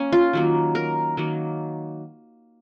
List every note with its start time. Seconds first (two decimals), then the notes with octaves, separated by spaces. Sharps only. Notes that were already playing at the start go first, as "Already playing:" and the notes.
Already playing: A#3 C#4
0.12 F4
0.33 D#3 F#3 A#3
0.75 A#4
1.17 D#3 F#3 A#3